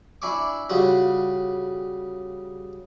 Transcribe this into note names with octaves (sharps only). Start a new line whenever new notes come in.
D4 E4 G#5 C#6 D6
C#3 G3 F4 F#4